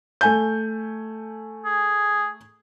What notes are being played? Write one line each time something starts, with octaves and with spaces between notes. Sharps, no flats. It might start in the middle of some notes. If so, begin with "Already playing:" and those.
A3 G#5 G6
G#4